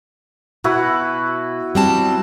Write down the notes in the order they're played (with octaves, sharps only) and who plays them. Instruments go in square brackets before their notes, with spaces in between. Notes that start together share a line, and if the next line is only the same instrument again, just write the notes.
[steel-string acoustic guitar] B2 [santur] E4 F#4 B4
[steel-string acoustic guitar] G3 C4 A5